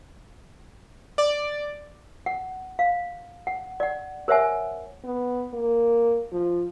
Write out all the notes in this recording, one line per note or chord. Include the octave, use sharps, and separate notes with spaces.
D5
F#5
F5
F#5
D5 F#5
A#4 C5 C#5 E5 F#5 G#5
B3
A#3
F3